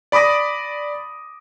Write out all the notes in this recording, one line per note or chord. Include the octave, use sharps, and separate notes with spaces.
D5 B5 D6 D#6 A#6